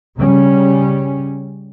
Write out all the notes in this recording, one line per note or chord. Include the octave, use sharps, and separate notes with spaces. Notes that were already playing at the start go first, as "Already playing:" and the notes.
C#3 G3 C#4